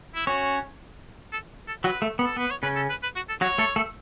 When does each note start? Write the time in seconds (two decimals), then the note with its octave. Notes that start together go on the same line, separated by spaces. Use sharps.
0.15 E4
0.27 C#4 F#4 C#5
1.32 A4
1.68 A4
1.84 F#3 F#4 B4
2.02 A3
2.19 B3
2.25 A4
2.37 B3 B4
2.50 C#5
2.63 C#3 C#4 B4
2.76 A4
2.90 B4
3.03 B4
3.16 F#4
3.29 A4
3.41 F#3 F#4 C#5
3.58 A3 A4
3.76 A3 A4